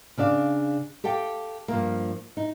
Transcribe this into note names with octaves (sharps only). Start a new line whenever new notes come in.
C#3 D4 D5 F5
G4 A4 F5 G5
G2 F3 A#3
D#4